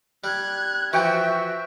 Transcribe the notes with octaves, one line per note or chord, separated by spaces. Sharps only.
G3 F#6 G#6
E3 F3 F#4 E5 G5